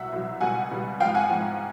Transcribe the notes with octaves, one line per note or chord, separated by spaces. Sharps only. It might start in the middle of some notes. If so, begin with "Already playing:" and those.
Already playing: C2 B2 F#3 E5 F#5
C2 B2 F#3
C#2 B2 G3 F#5 G#5
C#2 B2 G3
G#2 F3 F5 G5
F#5 G#5
G#2 F3